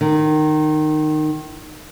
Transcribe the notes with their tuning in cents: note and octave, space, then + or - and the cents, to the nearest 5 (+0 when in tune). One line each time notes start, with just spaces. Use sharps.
D#3 -20